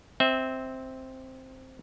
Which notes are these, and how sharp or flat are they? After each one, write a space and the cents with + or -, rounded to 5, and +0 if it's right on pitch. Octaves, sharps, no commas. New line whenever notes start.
C4 +0 E5 -25